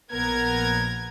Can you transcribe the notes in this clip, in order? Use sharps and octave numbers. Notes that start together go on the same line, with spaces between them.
A#1 B3 A#4 G#6